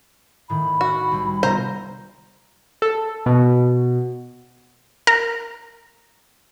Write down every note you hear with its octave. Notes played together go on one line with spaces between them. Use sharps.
A2 D#3 B5
F#4
C2 G3
C3 B3 F4 C5 A#5
A4
B2
A#4